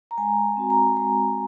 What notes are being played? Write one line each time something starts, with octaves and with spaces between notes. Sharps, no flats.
A#5
G#3 G#5
C4 F#4
A#5
G#3 A#5